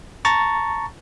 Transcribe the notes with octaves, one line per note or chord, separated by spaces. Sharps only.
A5 A#5 C#6 A6